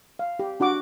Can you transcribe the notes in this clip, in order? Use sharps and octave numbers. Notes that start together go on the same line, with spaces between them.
F5
G4
D4 F#4 F#5 D6